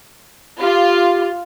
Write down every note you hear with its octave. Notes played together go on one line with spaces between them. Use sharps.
F4 G4